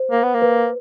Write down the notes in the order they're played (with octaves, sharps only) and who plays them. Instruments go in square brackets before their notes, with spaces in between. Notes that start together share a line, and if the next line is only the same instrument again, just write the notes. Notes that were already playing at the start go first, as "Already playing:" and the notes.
Already playing: [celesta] C5
[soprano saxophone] A#3
B3
A#3
[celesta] B4